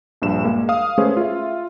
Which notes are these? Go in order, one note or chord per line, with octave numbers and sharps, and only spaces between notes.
A#1 G2 E7
G#3 A#3
F5 D#6
G#3 A3 C#4 G#4 B4 C5
F4 E5